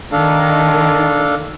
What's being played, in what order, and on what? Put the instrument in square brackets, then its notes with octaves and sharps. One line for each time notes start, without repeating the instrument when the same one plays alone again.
[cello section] D#3 [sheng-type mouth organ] D4 A4 F5